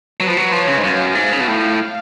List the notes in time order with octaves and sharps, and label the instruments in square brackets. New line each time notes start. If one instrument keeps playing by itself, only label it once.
[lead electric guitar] F#3 [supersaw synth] B4
[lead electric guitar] F3
F#3
[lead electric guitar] F3 [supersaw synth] C#5
[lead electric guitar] C#3
G#2
[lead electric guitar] F#2 [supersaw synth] F5
[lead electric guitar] G#2
C#3
B2
A2